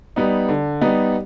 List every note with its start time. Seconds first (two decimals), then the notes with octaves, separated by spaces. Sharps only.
0.16 G3 B3 D#4
0.49 D3
0.81 G3 B3 D#4